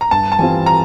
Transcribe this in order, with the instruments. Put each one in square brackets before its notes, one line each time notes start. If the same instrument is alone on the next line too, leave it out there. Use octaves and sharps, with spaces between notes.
[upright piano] A#5
[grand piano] G2 [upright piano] A5
[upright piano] A5
[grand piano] E3 G3 C4 F4 [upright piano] G#5
[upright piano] A#5